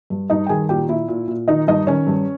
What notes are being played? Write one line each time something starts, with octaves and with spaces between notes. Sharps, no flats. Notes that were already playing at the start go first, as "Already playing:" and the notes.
G2
G2 D#4 D#5
G5
D#3 G#4 G#5
A#2 G4 G5
A#2 E4 E5
A#2
A#2
D#3 D#4 D#5
G2 D#4 D#5
D#3 C#4 C#5
G2